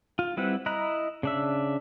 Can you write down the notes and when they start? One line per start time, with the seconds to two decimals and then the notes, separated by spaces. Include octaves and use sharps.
0.19 F4
0.37 G3 C4 E4 B4 F#5
0.66 E4 D#5 A#5 B5 F#6
1.23 C#3 D4 E5